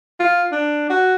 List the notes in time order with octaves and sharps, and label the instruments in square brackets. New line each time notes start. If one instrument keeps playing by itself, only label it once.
[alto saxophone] F4
D4
F#4